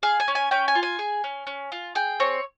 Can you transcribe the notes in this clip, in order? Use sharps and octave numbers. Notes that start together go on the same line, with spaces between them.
G#4 F5
G#5
C#4
G#5
C#4 G5
G#5
F4
G#5
G#4
C#4
C#4
F4
G#4 G5
C4 C#5